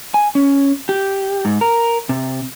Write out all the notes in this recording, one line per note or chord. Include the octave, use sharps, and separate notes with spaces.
G#5
C#4
G4
G#2
A#4
C3